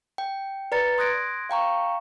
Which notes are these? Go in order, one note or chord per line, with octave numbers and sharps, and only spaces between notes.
G5
B4 D5 A#5 A6 C#7
C6 D#6 F#6 G#6 A#6 D7
F5 G5 A#5 C#6